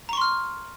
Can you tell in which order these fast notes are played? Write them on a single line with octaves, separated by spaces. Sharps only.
A#5 C#6 C6 F6